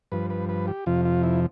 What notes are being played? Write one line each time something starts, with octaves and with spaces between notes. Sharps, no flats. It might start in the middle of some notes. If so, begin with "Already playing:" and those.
G2 F3 B4
B4
B4
G4
F2 C3 F3 F4
F4
E4